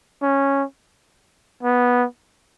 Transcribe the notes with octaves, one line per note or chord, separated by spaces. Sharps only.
C#4
B3